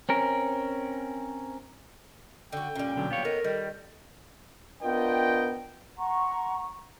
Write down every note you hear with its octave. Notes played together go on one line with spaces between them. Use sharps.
C4 C#4 A#4
D3 F#4 G5
A#2 G3 C#4
B1 D3 F#3
B3 C#5 F5
D#4 A4 A#4
D#3 G3
B3 D4 F4 A#4 D#5 G5
F#5 A#5 C6 C#6